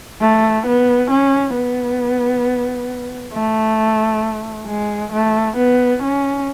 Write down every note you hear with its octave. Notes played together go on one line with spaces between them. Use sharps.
A3
B3
C#4
B3
A3
G#3
A3
B3
C#4